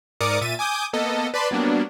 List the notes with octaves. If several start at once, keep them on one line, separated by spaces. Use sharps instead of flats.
G#2 A#4 D5 D6 D#6 C#7
A#2 E5 A6 D#7
G#5 D6 D#6 G6
A#3 B3 A4 D#5
B4 D5 A5 B5 C6
F#3 G3 A#3 B3 D4